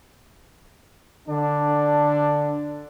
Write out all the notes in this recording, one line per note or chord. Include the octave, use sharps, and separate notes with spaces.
D3 D4